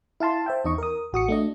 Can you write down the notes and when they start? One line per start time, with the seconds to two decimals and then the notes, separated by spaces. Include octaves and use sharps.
0.20 E4 F5 A5 C6
0.46 C5 E5 G5
0.65 E2 D#4 D#5 C#6
0.78 A#4 D#6
1.12 A1 F#4 D#6 C#7
1.28 A3 D4 D#5